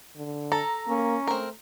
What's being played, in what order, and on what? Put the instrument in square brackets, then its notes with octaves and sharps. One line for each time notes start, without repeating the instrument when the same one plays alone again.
[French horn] D3
[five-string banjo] A4 [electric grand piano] A#5
[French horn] A#3 [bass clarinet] C#4
[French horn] A3 [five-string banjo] C4 A#4